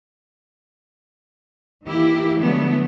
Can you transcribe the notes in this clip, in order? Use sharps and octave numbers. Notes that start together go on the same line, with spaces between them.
D#3 E3 A#3 E4 G4
D3 F3 F#3 G#3 A3 B3